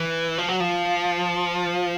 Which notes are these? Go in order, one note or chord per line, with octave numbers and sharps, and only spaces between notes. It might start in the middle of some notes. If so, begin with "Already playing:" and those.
Already playing: E3
F3
F#3
F3